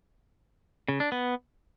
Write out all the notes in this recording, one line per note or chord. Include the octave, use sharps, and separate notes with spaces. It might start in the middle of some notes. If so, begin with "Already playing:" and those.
C#3
D4
B3